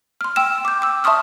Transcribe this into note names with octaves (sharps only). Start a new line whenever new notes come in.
C6 F6
G5 E6 E7
D6 G6
D6 E6
E5 A5 C6 C#6 D#6 F6